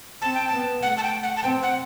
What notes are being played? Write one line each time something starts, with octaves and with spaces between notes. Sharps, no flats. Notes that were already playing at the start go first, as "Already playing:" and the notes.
C4 A5
G5
A5
B3
A3 F#5
A5
G5
F#5
A5
C4 G5
F#5